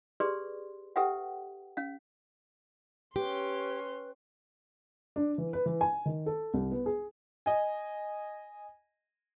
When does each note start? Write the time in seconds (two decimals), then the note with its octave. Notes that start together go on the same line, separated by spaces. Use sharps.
0.20 G4 G#4 B4 D5 C6
0.96 G4 A4 B4 E5 F#5 G5
1.77 C#4 F5
3.16 C#4 G4 B4 C6
5.16 D4
5.38 E3
5.53 B4
5.66 E3
5.81 G#5
6.05 D#3
6.26 A4
6.54 C2
6.71 B3
6.86 G#4
7.46 D#5 G#5